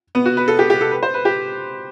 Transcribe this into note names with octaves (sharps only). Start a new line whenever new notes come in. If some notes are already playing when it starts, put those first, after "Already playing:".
B3
F#4
B4
A4
G4
G4
A4
B4
C5
B4
G4